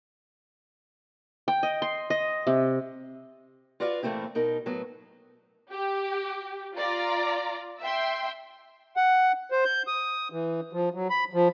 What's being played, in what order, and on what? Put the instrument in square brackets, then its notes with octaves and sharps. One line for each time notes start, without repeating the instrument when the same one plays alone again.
[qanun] G5
D#5
C6
D#5
C3
[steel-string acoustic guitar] F4 F#4 B4 D5 F5
A#2 E3 A3 A#3 C4 E4
B2 D#4 A#4
A2 F#3 B3
[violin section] G4
F4 D5 A#5
E5 G5 C6
[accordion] F#5
C5
G6
D#6
E3
F3
F#3
B5
F3